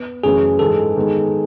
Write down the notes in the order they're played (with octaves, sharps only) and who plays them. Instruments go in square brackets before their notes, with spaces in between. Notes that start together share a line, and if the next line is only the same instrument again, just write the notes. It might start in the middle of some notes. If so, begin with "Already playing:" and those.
Already playing: [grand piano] B3
[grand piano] F#2 C#3 E3 A3 C#4 [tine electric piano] G#4
[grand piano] G#2 E3 G#3 [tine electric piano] A4
[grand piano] D#3 G#3 B3